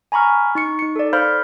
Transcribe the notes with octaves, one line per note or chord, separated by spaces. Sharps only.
G#5 A#5 B5 C#6 F6
D#4 C#6 C#7
D#4 C#7
A4 D5
C5 F5 B5 F6 G6